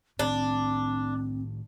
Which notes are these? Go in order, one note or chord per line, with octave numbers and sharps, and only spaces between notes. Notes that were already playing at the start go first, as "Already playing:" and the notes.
A2 D#3 C4 D4